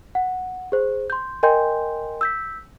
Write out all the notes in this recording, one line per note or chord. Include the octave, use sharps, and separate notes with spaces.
F#5
G#4 C5
C6 G6
A#4 D#5 G5 G#5 C6 G6
E6 G6 B6